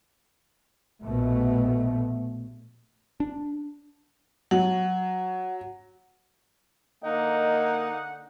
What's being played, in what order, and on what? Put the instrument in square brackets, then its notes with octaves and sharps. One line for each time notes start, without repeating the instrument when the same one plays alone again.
[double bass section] A#1 B2 A3
[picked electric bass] D4
[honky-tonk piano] F#3 [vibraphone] F#5
[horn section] D3 F#5 [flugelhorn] A#3 [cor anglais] D#4 [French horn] D#5